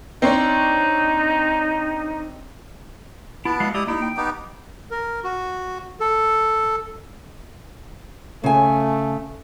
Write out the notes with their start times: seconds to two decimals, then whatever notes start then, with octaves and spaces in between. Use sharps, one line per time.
0.22 C4 D4 D#4 C#5
3.45 B3 E4 A5
3.60 F#3 G#3 F5
3.74 G#3 E4 G4 D5 D#6
3.87 A#3 D#4 E4
4.02 G5
4.17 B3 D#4 G4
4.91 A#4
5.24 F#4
6.00 A4
8.44 C#3 A3 G#5